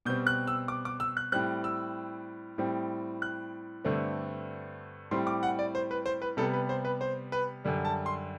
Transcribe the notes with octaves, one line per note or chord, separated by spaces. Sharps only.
B2 G3 C4 G6
F#6
E6
D6
D6
E6
F#6
A2 G3 C4 F#6
E6
A2 G3 C4
F#6
G2 D3 A3 C4
A2 G3 C4 C6
D6
F#5
D5
C5
B4
C5
B4
C3 G3 B3 A4
B4
C5
B4
C5
B4
F#2 D3 G3
A5
C6